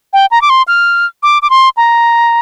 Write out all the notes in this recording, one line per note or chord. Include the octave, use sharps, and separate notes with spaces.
G5
A#5
D6
C6
F6
D6
D6
C6
A#5